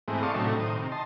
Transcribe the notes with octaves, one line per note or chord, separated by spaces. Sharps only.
G#2 E3 G#3 A3 C4
D5 F5 A5 C6 C#6 D#6
A2 C3 F#3 A3 D4 D#4
A2 D#3 C5 D#6
C3 D#3
D#5 A5 C6